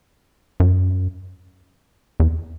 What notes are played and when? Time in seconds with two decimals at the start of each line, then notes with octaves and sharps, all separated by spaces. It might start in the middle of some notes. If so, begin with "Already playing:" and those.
0.60 F#2
2.20 E2